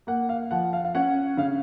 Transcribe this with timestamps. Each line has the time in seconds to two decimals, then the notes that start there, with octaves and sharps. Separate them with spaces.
0.07 A#3 F#5
0.29 F5
0.51 F3 F#5
0.73 F5
0.85 F5
0.95 C#4 F#5
1.37 C#3 F5